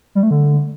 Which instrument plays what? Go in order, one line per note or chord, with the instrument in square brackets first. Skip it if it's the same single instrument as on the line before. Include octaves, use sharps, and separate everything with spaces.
[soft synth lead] G3
A3
D3